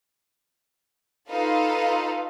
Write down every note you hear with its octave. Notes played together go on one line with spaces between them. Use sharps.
D#4 F4 A4 B4 F5